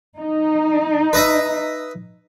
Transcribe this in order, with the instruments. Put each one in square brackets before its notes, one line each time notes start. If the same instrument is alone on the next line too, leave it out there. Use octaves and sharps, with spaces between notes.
[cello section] D#4
[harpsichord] B4 D#5 E5